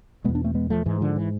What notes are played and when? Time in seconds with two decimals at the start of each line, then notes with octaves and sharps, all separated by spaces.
0.24 B2 G#3 B3
0.29 E2
0.35 B3 D4
0.44 A3 C4
0.55 G#3 B3
0.70 F3 A3
0.86 G#2 E3 G#3
1.01 D3 F3
1.16 E3